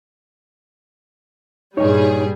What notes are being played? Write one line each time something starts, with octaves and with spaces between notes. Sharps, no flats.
G2 A#2 G3 D#4 G#4 C#5